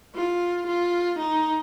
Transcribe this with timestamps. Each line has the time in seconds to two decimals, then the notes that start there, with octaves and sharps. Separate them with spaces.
0.15 F4
0.67 F4
1.19 D#4